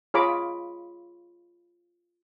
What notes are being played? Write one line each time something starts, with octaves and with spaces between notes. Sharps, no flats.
F4 G#4 C#5 A#5 B5 D6